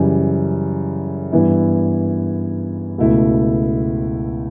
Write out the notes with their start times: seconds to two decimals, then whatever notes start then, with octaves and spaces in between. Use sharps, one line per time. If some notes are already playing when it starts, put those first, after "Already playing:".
Already playing: F#2 C#3 E3 G3
1.32 G2 E3 B3 E4
2.98 C#2 B2 A3 E4